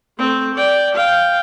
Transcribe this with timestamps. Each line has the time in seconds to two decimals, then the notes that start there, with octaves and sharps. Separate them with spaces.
0.18 A3 C4
0.54 D5 G5
0.95 F5 G5